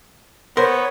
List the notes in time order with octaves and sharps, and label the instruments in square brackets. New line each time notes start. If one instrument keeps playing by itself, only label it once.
[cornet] B3 [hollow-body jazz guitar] A#4 C5 [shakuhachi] C#5